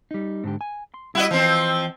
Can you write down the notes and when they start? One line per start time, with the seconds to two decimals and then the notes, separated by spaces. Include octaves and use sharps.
0.11 G3 D#4
0.44 G#2 D3 G4
0.61 G#5
0.94 C6
1.15 G3 E4 F#4 D#5
1.31 E3 F3 C4